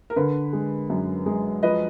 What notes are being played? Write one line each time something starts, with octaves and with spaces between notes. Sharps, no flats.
A#4
D3 B4
G#3
F#2
G#3
F3 B4 D#5